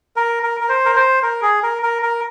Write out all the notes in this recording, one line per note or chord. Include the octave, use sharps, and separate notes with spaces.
A#4
A#4
A#4
C5
A#4
C5
A#4
G#4
A#4
A#4
A#4